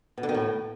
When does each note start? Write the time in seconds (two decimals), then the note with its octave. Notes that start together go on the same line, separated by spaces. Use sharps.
0.18 B2
0.23 D3
0.29 D#3
0.34 A2